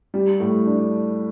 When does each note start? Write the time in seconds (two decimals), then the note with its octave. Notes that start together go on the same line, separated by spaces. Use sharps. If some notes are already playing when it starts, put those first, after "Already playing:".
0.14 G3
0.40 A2
0.66 D4